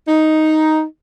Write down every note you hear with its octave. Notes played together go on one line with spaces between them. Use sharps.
D#4